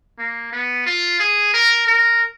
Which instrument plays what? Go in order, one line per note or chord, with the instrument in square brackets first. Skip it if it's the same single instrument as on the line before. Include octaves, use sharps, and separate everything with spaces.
[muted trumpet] A#3
B3
F4
G#4
A#4
A#4